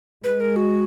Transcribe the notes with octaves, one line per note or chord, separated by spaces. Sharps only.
G#3 B4
A#4
F#4